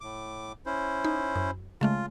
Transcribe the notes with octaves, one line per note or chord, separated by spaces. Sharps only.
A2 D6
C#4 E4 C5
D#4
F#2
C#3 G#3 A3 F4